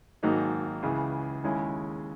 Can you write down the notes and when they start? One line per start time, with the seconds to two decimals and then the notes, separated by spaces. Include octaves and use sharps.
0.23 G#1 G#2 F#3 A#3 D#4
0.83 C#2 C#3 E3
1.44 D#2 C#3 G#3 C#4 E4